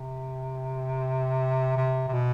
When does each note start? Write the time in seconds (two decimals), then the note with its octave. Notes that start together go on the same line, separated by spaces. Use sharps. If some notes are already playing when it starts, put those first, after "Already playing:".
Already playing: C3
1.77 C3
2.08 C3
2.13 B2